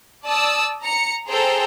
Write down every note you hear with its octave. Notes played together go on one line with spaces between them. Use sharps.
D5 A5 D#6 E6
A#5 C#7
G#4 A4 C5 G5 A#5